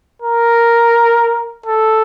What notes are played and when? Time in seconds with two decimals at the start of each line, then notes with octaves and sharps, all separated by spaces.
0.22 A#4
1.66 A4